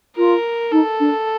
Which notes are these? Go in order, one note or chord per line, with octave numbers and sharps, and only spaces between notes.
F4 A#4
D#4 A4
D4